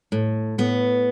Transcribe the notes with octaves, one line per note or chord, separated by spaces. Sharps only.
A2
A2 B3